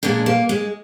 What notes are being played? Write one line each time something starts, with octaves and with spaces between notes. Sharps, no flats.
A#2 F3 G#3 D4
A#3
G#3